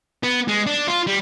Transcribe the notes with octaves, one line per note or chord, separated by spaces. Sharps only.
B3
G#3
D4
F4
G3